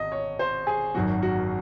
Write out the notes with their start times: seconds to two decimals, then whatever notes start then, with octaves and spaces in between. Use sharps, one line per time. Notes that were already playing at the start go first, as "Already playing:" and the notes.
Already playing: G#1 D#5
0.12 C#5
0.39 C5
0.67 G#4
0.94 G#1 F#2 D#3 F#3 F#4
1.23 F#4